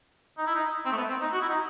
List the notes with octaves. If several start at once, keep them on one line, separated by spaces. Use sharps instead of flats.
D#4
E4
D#4
C4
A3
B3
C4
D#4
F#4
E4
D#4